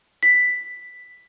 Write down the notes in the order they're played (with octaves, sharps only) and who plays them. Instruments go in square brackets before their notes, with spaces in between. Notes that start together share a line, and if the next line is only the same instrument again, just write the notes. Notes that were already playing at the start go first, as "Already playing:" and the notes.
[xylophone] B6